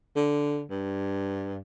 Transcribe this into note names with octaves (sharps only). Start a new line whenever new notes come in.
D3
G2